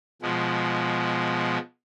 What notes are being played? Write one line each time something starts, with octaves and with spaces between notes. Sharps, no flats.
B2 F3 G#3